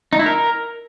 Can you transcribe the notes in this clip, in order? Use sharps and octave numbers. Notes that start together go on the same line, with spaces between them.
D#4
E4
A#4